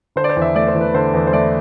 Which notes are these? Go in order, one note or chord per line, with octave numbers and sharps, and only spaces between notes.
D3 C5
D5
C5
E2
E5
A3 D5
C5
E2
B4
D3 C5
E2
C5
A3 D5